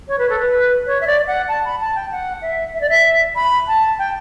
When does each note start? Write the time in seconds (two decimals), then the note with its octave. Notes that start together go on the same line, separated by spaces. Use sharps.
0.08 C#5
0.18 B4
0.29 A4
0.39 B4
0.86 C#5
1.01 E5
1.07 D5
1.27 F#5
1.48 A5
1.65 B5
1.80 A5
1.95 G5
2.11 F#5
2.42 E5
2.74 E5
2.81 D5
2.89 E5
3.35 B5
3.67 A5
3.98 G5